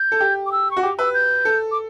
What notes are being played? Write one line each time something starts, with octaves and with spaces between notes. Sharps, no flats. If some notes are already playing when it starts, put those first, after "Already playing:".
Already playing: G6
A4
G4
D6
E6
C#6
F#4
G4 D6
B4 E6
G6
A4
D6